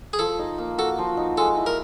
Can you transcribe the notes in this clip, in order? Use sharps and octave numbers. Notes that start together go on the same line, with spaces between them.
G#4
F3 A4
D#4
A#3
F#4 A4
F3
D#4
G#3 A4
E4
A#4